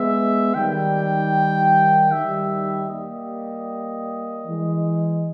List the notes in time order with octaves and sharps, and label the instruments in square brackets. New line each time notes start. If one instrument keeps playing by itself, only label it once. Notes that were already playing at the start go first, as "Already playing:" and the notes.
Already playing: [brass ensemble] G#3 B3 [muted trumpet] E5
[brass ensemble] D#3 G3 [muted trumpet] G5
[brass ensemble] D#3 G3 [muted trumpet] E5
[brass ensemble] G3 A#3 [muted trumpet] D#5
[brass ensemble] E3 G#3